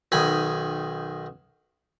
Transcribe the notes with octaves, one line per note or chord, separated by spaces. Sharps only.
B1 D#3 G#5 B5